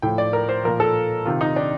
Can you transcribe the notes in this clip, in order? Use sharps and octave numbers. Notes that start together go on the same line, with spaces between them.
A2 F3 G5
D5
A#4
C5
A#2 F3 A#4
A4
C3 D#3 F4
D#4
D4